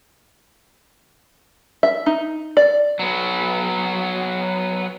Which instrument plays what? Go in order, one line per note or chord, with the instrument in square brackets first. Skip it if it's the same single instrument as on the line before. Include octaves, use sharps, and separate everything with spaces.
[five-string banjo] E5
D#4
D5
[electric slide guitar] F#3 B3